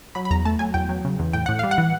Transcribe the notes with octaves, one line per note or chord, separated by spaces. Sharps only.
F#3 B5
B5
E2 A#5
A3 A5
F#3 G#5
E2 G5
F#3
C#3
E2
A2 G5
A2 F#5
G3 F5
F#5
E3